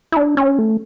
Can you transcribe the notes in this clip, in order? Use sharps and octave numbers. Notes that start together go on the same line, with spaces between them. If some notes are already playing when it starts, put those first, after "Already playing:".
E4
D4
C#4
A3